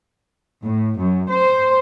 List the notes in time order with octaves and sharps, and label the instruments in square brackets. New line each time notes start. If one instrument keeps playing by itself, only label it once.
[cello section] A2
F#2
C5